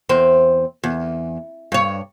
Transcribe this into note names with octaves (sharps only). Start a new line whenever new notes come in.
E2 C4
E2
G2 C#5